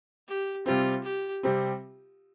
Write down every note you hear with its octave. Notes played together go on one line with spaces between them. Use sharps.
G4
C3 G3 C4 F4
G4
C3 G3 C4